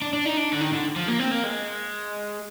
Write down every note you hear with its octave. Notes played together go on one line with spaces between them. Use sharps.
D4
D4
D#4
D4
D3
D#3
D3
F3
A#3
C4
A#3
G#3